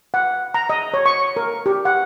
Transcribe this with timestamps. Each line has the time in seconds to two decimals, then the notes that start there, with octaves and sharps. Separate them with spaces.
0.14 F#5
0.54 A#5
0.70 D#5
0.94 C#5
1.06 C#6
1.37 A#4
1.66 G4
1.85 F#5